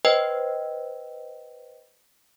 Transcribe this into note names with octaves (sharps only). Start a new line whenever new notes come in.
B4 C5 D#5 G5